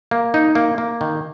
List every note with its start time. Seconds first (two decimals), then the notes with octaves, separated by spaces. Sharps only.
0.11 A#3
0.34 D#4
0.55 A#3
0.78 A#3
1.01 D#3